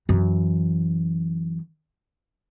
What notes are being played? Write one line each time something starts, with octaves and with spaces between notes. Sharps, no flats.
F#2 E3